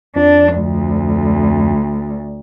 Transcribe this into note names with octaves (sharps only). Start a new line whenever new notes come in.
F2 D4
D2